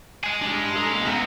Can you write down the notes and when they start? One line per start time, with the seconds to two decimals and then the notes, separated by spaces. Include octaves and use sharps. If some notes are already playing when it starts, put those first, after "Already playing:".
0.24 G#3 G#4
0.42 D4 G4
0.76 A4 A#5
0.90 A#3 C#4
1.06 B3 E4 A#5